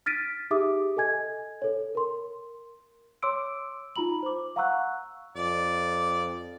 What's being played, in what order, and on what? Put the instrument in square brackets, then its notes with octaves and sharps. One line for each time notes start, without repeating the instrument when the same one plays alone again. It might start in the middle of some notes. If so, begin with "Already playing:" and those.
[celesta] F6 A6 B6 D7 D#7
D#4 G4 G#4 E5 D6 D#6
A4 D#5 G#5 G#6
A4 C#5
A#4 C6
C#5 C6 D6 E6 D7
D#4 F4 A#5 B5 F#7
C5 D6
F5 F#5 A#5 C#6 E6 F#6
[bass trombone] F2 [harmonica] D5